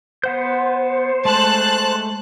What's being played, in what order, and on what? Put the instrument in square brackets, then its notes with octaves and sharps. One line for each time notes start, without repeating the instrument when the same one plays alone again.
[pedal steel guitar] B3 F#5 G6 [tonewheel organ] C5
[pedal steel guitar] G#3 A3 [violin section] A5 F#6